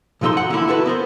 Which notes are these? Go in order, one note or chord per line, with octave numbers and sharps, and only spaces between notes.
B1 G2 F3 D#4 A4 C6
F#4 F#5
D3 E3 A#3 E4
E4 F#4 A4 B4
B3 A#4 C5